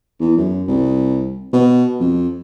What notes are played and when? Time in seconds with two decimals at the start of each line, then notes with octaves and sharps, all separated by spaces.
0.20 E2
0.37 F#2
0.68 C2
1.53 B2
2.00 F2